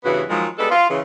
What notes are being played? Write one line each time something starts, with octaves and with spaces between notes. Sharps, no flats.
G2 C#3 E3 B3 F#4
D#3 F3 F#3 G#3
G3 G#3 B3 A4
F4
C#3 E3